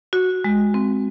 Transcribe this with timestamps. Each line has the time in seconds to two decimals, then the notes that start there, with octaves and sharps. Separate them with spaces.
0.13 F#4
0.44 G#3
0.74 C4